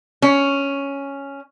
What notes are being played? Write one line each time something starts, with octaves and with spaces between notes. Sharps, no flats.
C#4